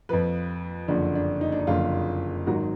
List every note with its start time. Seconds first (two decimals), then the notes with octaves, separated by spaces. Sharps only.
0.09 F2 F3 B4
0.88 F#1 F2 D3 D4
1.15 D4
1.41 D#4
1.52 D4
1.59 D#4
1.67 F#1 F2 D3 F4
2.47 G#1 G#2 D#3 F#3 F#4